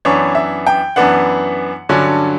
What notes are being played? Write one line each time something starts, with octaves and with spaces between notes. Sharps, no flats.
F#2 E3 B3 D4 C#5
E5
G5
F#2 E3 B3 D4 F#5
G2 D3 F#3 C#4